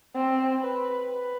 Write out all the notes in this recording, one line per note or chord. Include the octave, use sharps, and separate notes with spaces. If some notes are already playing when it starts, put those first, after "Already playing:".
C4
B4
B4